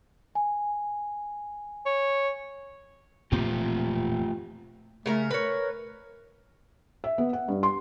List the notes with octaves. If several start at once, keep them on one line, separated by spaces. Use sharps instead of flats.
G#5
C#5
E1 A#2 A3 C4 F4 G4
C#3 A3 A#4 A#5
A#4 B4 C#5
E5
B3
F#5
G2
C6